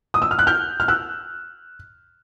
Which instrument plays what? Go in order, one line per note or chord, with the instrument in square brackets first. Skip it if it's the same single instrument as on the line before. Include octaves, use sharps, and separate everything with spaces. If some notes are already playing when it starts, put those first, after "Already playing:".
[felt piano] D#6
E6
F6
F#6
F6 G6
F6
E6 F#6